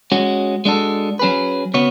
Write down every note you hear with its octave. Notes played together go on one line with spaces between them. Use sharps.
G#3 C#4 F#4
G#3 D4 F#4 A4
F#3 C#4 G#4 B4
C#3 B3 F#4 C#5